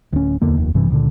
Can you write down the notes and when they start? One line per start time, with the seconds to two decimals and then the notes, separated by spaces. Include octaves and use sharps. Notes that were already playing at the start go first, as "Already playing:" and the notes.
0.13 D1 C#4
0.42 D1 E2 D3 A#3
0.57 F1 D#2
0.74 A1 G2 C3 E3
0.90 C#2 A#2 D3